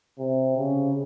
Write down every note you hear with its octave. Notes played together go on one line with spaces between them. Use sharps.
C3
C#3